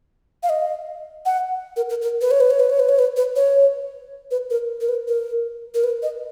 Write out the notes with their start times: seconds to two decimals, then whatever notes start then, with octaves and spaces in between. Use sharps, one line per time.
0.43 F5
0.49 D#5
1.26 F#5
1.76 A#4
1.90 A#4
2.02 A#4
2.21 B4
2.31 C#5
2.41 B4
2.51 C#5
2.60 B4
2.70 C#5
2.80 B4
2.89 C#5
2.99 B4
3.17 B4
3.36 C#5
4.31 B4
4.50 A#4
4.81 A#4
4.89 B4
5.08 A#4
5.74 A#4
5.84 B4
6.03 D#5